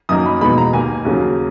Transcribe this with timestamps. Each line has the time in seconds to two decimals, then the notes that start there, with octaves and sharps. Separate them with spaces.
0.09 F#2 D#3 A#3 D#4 D#6
0.26 B5
0.41 E2 B2 G#3 D#4 B5
0.58 A#5
0.73 D#2 D#3 A#3 G#5
1.05 D#2 C#3 F#3 A#3